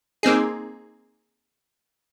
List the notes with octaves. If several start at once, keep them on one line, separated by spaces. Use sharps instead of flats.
A#3 C4 D#4 G#4